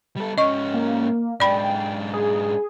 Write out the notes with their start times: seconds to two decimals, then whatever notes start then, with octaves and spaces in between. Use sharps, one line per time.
0.16 G3 A4
0.38 G#2 C#4 D#5 C#6
0.74 A#3
1.40 G#2 D4 D5 G5 B5
2.13 G#4